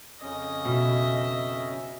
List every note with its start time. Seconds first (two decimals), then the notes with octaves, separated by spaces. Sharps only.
0.22 F2 C#3 C#4 D#5
0.65 B2 E5